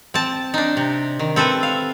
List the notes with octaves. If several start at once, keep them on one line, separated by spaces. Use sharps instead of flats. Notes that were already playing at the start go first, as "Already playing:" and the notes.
C4 A5
D4 D#4
C3
D#3
C4 A4 B4 E5
F5